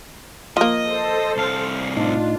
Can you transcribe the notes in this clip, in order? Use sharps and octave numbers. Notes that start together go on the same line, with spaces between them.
F3 A#3 D#5
A4 C5
C2 F5
A2 D4 D#4 F4